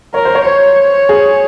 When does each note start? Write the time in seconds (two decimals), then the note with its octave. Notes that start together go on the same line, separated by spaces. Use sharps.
0.14 A#4 C#5
0.25 C5
0.35 C#5
0.45 C5 C#5
1.09 G#4